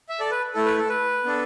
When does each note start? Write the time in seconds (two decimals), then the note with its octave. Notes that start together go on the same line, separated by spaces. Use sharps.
0.09 E5
0.20 A4 D5
0.31 B4
0.54 A3 E4 A4
0.66 B4
0.78 A4
0.89 B4
1.25 B3 D4 A4